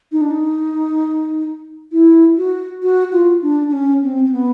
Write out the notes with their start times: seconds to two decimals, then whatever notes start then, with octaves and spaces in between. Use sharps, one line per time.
0.12 D#4
0.21 D4
0.31 D#4
1.92 E4
2.38 F#4
2.83 F#4
3.13 F4
3.42 D4
3.68 D4
3.73 C#4
4.03 C4
4.24 C4
4.32 B3